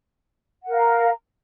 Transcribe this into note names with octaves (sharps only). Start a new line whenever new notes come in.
A#4 F5 F#5 A#5